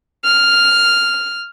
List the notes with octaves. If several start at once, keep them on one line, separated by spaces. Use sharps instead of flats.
F6